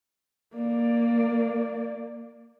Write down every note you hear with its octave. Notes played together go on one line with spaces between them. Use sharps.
A#3 D5